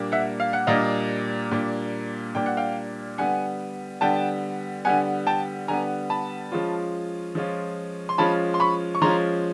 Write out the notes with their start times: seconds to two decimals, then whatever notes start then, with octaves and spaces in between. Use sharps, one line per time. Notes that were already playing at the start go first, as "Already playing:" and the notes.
Already playing: A#2 G3 A#3 D4
0.12 E5 F#5
0.40 F5
0.53 F#5
0.67 A#2 G3 A#3 D4 D#5 F5
1.51 A#2 G3 A#3 D4
2.35 A#2 G3 A#3 D4 G5
2.46 F#5
2.57 F5 G5
3.18 D3 G3 B3 F#5 G#5
4.01 D3 G3 B3 G5 A5
4.85 D3 G3 B3 F#5 G#5
5.27 G5 A5
5.68 D3 G3 B3 G#5 A#5
6.10 A5 B5
6.52 F3 G#3 C#4 F4
7.35 F3 G#3 C#4 F4
8.09 C6
8.18 F3 G#3 C#4 F4 A5 B5
8.54 C6
8.60 B5 C#6
8.95 C#6
9.02 F3 G#3 C#4 F4 A#5 C6